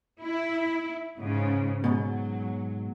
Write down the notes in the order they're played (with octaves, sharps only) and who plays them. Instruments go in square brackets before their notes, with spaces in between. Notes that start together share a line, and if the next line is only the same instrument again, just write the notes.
[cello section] E4
G#2 C#3
[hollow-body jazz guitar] G#2 B2 [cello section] F#3